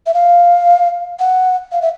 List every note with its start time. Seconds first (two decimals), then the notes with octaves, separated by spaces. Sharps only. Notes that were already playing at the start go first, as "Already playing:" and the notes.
0.06 E5
0.14 F5
1.20 F#5
1.72 F5
1.82 E5